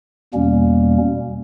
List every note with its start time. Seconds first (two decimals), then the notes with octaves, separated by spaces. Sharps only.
0.34 E2 B2 G3 A#3 C#4